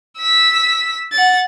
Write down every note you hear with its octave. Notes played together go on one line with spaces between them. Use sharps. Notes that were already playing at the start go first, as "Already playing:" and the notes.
E6 B6
F#5 A6